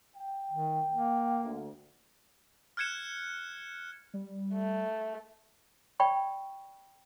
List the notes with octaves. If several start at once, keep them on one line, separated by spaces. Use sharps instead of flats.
G5
D#3
A#3
D2
F6 F#6 G#6 C#7 E7
G3
A3
D5 G5 B5 C#6